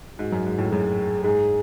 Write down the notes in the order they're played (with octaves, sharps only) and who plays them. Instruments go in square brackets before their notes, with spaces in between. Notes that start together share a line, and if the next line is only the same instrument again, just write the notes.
[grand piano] G#2 [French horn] F#4
[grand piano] F#2
G#2
A2
[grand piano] F#2 [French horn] G#4
[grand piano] G#2 [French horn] G#4